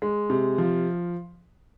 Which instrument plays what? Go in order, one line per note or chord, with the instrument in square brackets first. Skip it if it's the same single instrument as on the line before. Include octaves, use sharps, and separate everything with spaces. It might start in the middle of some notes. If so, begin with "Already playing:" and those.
[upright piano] G#3
C3
F3